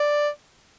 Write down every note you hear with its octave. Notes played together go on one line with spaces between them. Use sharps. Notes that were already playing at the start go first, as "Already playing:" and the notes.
Already playing: D5